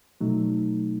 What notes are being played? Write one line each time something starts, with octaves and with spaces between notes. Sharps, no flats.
B2 F#3 A3 D#4